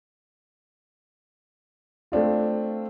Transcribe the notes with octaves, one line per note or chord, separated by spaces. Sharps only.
A3 C4 D4 F4